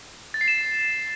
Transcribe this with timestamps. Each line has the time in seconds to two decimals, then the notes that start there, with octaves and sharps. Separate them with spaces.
0.34 A6
0.41 C7
0.48 E7